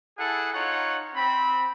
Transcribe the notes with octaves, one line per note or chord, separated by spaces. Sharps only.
E4 G#4 A4 F#5
D#4 F4 C#5 F#5
C4 B5